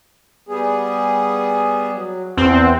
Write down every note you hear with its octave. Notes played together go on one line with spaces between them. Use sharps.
G3 B3 G#4
F#3
E2 C4 F#5